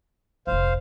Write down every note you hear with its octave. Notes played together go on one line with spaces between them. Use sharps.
F1 A#1 C5 F5